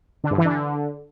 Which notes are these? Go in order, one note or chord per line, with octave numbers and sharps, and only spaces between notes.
D3
G2
E3
D3